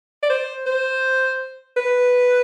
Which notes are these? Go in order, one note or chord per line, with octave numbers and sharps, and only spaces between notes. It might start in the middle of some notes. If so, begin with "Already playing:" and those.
D5
C5
C5
B4